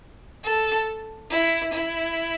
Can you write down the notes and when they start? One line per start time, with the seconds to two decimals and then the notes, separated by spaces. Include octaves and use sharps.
0.45 A4
1.31 E4
1.74 E4